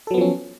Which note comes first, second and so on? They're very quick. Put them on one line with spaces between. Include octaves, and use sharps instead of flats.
A4 F#3 B3 F3 C#4